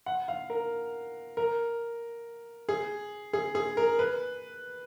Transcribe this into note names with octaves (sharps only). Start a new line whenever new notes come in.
F#5
F5
A#4
A#4
G#4
G#4
G#4
A#4
B4